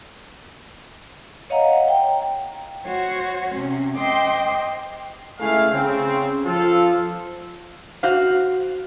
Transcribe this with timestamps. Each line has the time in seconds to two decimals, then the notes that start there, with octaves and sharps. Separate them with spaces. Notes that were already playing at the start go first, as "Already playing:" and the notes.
1.50 C#5 D#5 F5 F#5 A#5
1.88 G5
2.85 F#4 C5 C#5
3.51 C3 C#4
3.96 C5 D#5 G5 C6 D6
5.40 C#2 A3 E4 G#4 F5
5.71 C#3 C4
6.45 F3 F4 A4
8.03 F#4 C5 F5